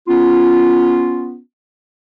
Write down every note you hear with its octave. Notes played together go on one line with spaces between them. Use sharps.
B3 C#4 F4